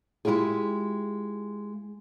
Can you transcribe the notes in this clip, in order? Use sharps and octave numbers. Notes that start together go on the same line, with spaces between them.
G#3 E4 F4 G4 G#4